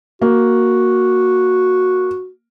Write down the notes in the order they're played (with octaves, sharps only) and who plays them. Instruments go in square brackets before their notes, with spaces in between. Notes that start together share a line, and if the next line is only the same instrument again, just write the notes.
[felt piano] A#3 [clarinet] F#4